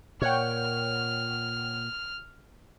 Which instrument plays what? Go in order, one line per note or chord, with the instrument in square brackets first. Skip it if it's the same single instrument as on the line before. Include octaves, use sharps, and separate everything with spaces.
[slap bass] A#2 [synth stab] C#5 F#5 G5 [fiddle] F6